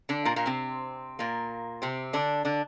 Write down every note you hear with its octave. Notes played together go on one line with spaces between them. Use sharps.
D3 D4
A#2 A#3
A#2 A#3
C3 C4
A#2 A#3
C3 C4
D3 D4
D3 D4